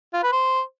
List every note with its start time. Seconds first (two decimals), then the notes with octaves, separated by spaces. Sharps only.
0.14 F4
0.23 B4
0.32 C5